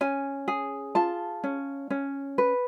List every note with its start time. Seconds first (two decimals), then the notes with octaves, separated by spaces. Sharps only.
0.01 C#4 G#5
0.48 G#4
0.95 F4 A5
1.44 C#4
1.90 C#4
2.38 B4